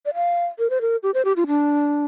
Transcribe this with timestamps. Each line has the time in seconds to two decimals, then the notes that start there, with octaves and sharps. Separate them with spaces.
0.06 D5
0.14 F5
0.59 A#4
0.70 C5
0.81 A#4
1.03 G4
1.14 C5
1.25 G4
1.36 F4
1.47 D4